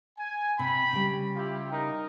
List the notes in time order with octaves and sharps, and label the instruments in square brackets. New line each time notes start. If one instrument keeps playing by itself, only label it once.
[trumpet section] G#5
[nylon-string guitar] C3 [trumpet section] G5 B5
[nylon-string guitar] C#3 G3
[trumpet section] E4 F4 G4
D#4 A#4